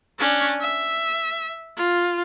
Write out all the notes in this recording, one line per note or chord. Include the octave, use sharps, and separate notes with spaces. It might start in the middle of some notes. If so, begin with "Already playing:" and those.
C#4 D4
E5
F4